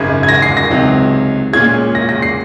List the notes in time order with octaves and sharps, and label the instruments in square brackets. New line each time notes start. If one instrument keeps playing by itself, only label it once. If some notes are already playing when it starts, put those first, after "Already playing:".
Already playing: [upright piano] G#1 F#2 C#3 G#3 [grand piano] G#6
[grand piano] G#6
A#6
C7
A#6
[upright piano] C#2 C3 D#3 F#3
[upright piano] A#2 G#3 C#4 F4 G#4 [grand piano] G#6
[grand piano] A#6
A#6
C7